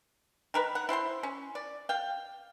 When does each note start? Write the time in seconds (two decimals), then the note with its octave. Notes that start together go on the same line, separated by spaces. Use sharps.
0.54 D#3 A#4 B4
0.75 F#5
0.89 E4 C5 A5 C6
1.23 C#4
1.55 D5
1.89 F5 G5